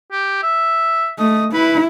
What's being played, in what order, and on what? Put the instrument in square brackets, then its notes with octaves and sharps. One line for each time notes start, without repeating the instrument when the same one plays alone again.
[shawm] G4
E5
[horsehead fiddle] A3 [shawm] D#5
[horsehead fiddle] E4 [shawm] B4